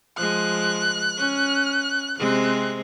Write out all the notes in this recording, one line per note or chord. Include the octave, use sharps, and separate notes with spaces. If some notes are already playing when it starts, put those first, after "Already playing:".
F3 G#3 F#6
C#4
C3 G#3 C4 F#6